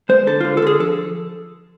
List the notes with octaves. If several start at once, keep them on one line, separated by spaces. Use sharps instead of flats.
G#3 C5
D3 A4
D3 F4
A4
D3 G#4
F3 A4